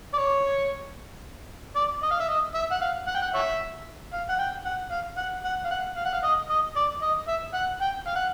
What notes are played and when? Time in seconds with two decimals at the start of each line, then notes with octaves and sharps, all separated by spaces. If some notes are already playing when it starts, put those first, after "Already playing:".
0.14 D5
0.18 C#5
1.76 D5
2.03 D#5
2.11 F5
2.20 E5
2.29 D#5
2.55 E5
2.72 F#5
2.81 F5
3.08 F#5
3.15 G5
3.22 F#5
3.34 C#5 E5
4.13 F5
4.29 F#5
4.39 G5
4.65 F#5
4.91 F5
5.17 F#5
5.44 F#5
5.65 F5
5.71 F#5
5.96 F5
6.05 F#5
6.13 F5
6.23 D#5
6.50 D#5
6.76 D5
7.02 D#5
7.28 E5
7.54 F#5
7.81 G5
8.07 F5
8.16 F#5